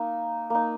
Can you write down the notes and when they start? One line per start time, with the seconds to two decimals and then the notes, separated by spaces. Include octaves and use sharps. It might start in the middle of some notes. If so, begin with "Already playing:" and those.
Already playing: A#3 D#4
0.50 A#3 D#4